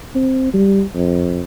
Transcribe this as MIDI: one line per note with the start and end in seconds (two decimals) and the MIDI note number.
0.15 0.48 60
0.53 0.83 55
0.95 1.40 41